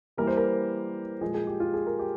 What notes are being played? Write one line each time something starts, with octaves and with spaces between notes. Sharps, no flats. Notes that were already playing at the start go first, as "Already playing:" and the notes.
E3 G3 A#3 A#4
C5
A#4
A#2 F3 G#3 G#4
G#4
G4
F4
G#4
A#4
G4